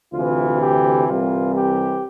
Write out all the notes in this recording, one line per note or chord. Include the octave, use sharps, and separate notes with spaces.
D2 C3 E3 F4
G4
C2 C3 E3 F4
G4